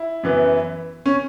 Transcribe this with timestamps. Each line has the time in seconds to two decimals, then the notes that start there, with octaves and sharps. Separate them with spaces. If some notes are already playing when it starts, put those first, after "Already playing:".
Already playing: E4
0.23 F#2 E3 B3
1.06 C#4